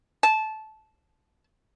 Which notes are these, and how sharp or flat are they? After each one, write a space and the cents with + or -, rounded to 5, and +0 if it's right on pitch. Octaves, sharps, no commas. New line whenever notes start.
A5 -15